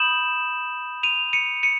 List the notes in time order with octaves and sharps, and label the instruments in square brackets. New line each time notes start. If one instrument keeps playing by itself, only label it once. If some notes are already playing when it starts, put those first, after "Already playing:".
Already playing: [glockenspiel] B5 D#6 G6 E7 F#7
D#7 F7
C#7 D#7
C#7 D#7